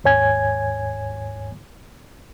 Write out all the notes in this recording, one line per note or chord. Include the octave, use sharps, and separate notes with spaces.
D#2 G#2 C#5 G#5 G#6